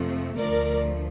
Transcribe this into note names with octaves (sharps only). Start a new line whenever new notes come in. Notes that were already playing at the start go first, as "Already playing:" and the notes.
Already playing: F2 C3 F3 A3
D2 D3 F3 A3 A#4 D5